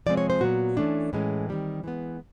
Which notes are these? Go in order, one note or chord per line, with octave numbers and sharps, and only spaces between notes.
C3 F3 G#3 C4 D5
C#5
C5
A#2 F#3 B3 F#4
E3 A3 C#4 D4
A2 E3 G#3 C#4
D#3 G3 C4
E3 G#3 B3